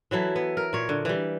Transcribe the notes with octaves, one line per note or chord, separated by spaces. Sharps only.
E3 F#3 E4 A4
B3
A#4
A#2 C#5
D3
E3 G3